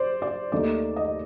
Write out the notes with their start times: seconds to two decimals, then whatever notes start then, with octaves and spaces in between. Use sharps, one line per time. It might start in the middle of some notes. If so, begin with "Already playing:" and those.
Already playing: C5 D5
0.22 D5
0.52 D#2 D#3 A3 D5
0.96 D#5